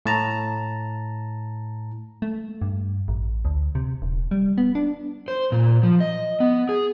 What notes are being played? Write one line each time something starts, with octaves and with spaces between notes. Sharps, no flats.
A2 A5 A#5
A3
G2
A1
D2
C3
D#1
G3
B3
D4
C5
A#2
F3
D#5
B3
G#4